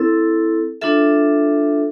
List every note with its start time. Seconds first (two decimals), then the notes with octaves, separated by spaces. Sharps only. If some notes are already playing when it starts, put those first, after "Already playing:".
Already playing: C4 E4 A4
0.81 D4 F4 A4 E5